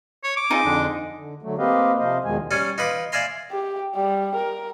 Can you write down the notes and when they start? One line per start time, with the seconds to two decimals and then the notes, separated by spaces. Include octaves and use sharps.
0.23 C#5
0.37 D6
0.50 C4 D#4 F4 G#4
0.65 F2 D3 D4
1.16 D3
1.42 D3 F#3 A3
1.58 A#3 C4 G4 B4 D#5 F5
1.99 C3 F3 C5 D#5 F5
2.24 E2 B2 D#3 F3 G#3 G#5
2.51 G3 C#4 G#5
2.78 D#4 F4 B4 B5 D6
3.12 D5 E5 F5 G#5 A#5 C6
3.51 G4
3.96 G3
4.35 A#4